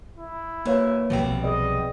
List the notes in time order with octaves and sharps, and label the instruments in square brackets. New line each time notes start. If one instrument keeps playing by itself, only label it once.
[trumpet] E4
[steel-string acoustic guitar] F#2 E3 [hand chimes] A#3 C#5 F5
[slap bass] B1 C3 F3 [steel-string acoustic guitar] G3 B3 C4
[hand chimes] G#4 B4 D5 [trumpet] D#5